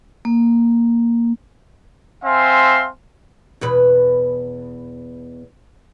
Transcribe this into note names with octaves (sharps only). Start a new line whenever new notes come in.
A#3
C4 E5 F5 G#5 C6
E2 B2 B4